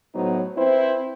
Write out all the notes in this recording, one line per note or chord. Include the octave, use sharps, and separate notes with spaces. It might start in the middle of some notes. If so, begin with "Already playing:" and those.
A2 F#3 B3 D#4 C5
C4 E4 B4 C5